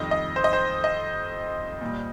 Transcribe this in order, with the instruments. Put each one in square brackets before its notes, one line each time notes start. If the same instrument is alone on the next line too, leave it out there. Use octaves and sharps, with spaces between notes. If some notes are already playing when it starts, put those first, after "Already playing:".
Already playing: [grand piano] F2 D#3 G3 D#5
D#5
C5
D#5
C5
D#5
A#2 G3